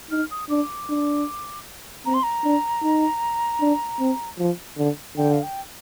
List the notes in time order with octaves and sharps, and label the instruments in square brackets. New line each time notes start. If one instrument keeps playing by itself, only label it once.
[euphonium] D#4 [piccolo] F6
[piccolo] D#6
[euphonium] D4 [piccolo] D6
[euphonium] D4
[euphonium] C4 [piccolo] A#5
[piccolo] C6
A#5
[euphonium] D4
D#4
D4
C4
F3
D3
[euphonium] D3 [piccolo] G5
[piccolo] F5
G5